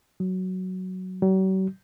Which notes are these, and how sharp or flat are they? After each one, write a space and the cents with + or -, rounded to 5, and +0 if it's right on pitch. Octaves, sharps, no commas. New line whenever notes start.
F#3 +5
F#3 +45